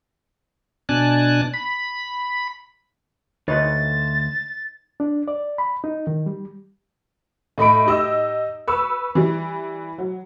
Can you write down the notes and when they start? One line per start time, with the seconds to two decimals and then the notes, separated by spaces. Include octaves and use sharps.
0.89 B2 D4 G#5 A5 F#6
1.54 B5
3.48 D2 D#4 B4 C#5 A6
5.00 D4
5.28 D5
5.58 B5
5.84 D#4
6.07 D#3
6.26 G3
7.58 A2 D#5 B5 D7
7.86 D#4 G4 D#5 E6
8.68 B4 C#6 E6
9.15 E3 G3
9.98 F#3